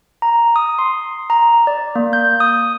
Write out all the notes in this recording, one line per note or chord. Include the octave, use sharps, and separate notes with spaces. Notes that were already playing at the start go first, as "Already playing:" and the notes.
A#5
D#6
C6
A#5
D5
A#3
G6
D#6